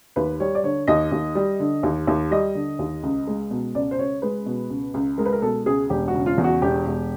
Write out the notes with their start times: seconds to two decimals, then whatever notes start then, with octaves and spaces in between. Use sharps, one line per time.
0.16 D#2 B4
0.40 G3 C#5
0.55 D5
0.64 D3 C#5
0.87 D#2 D#5
1.12 D#2
1.35 G3
1.60 D3
1.83 D#2
2.07 D#2
2.31 G3 D#5
2.55 D3
2.79 D#2
3.03 C#2
3.27 G#3
3.51 B2
3.75 C#2 D5
3.91 C5
3.98 C#2 C#5
4.22 G#3 B4
4.46 B2
4.70 C#2
4.94 C#2
5.18 G#3 A#4
5.26 B4
5.33 A#4
5.42 B2 A4
5.66 C#2 G#4
5.90 E1 G4
6.08 F#4
6.14 C#3
6.26 F4
6.38 E2
6.44 F#4
6.62 E1 G4
6.86 E1